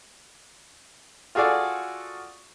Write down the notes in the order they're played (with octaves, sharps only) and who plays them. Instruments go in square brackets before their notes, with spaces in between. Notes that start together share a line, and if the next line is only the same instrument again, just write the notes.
[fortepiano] F4 F#4 G#4 A4 D5